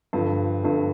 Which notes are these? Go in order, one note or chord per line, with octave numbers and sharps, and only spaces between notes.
G2 D3 F3
G2 D3 F3